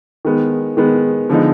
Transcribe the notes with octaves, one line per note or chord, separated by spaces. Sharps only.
D#3 G#3 B3
D#3 G#3 B3
D3 F3 G#3 B3 D#4